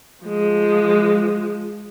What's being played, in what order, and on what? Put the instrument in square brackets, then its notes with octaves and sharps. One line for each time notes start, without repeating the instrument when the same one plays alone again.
[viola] F3 G#3